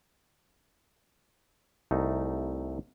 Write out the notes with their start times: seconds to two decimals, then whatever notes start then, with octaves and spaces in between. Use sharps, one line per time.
1.91 C2 A3 D#4